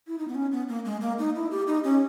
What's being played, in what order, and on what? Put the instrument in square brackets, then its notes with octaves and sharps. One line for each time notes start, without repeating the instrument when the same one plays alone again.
[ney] E4
D#4
B3
C#4
B3
A#3
G#3
A#3
D#4
E4
G4
D#4
C#4